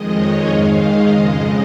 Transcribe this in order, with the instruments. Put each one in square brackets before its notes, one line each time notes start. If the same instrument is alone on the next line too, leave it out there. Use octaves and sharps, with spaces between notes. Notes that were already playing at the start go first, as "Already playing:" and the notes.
Already playing: [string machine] F2 D#3 G#3 D#5
C#5
G#2 D#3 G#3 F5
D#5
F2 C#3 G#3